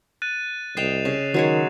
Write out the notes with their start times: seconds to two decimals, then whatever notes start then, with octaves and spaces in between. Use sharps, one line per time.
0.22 F#6 A6 D#7
0.77 C2 D#5 G5 C7 E7 F7
1.05 C#3
1.34 D#3 F#3 G#3 C#5